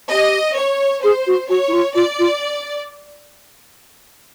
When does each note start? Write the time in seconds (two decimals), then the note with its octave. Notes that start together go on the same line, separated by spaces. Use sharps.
0.10 G4 D#5
0.57 C#5
1.03 G#4 C5
1.27 F#4
1.49 F#4 C#5
1.68 E4
1.73 F4
1.95 F4 D5
2.19 F4